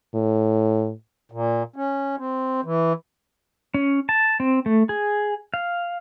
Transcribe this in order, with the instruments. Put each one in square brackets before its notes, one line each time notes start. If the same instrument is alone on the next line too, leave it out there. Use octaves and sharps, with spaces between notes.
[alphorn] A2
[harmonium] A#2
C#4
C4
E3
[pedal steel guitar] C#4
A5
C4
A3
G#4
F5